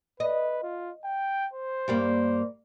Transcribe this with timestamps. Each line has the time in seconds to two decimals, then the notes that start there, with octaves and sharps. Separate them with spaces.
0.20 B4 D#5
0.63 F4
1.04 G5
1.54 C5
1.88 G2 G3 A#3